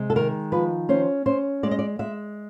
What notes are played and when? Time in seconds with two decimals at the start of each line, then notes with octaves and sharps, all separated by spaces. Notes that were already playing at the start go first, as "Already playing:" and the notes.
Already playing: C3 G#3
0.10 A4
0.16 D#3 A#4
0.52 F3 B4
0.89 C#4 C5
1.26 C#4 C5
1.63 G#3 D5
1.71 D#5
1.79 D5
1.99 G#3 E5